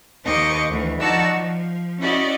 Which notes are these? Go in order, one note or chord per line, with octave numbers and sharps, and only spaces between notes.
D#2 D#4 C5 D#5 C#6 D6
D2 E3
F3 D#4 F#4 D5 A5 E6
F3
C#4 E4 F#4 D5 D#5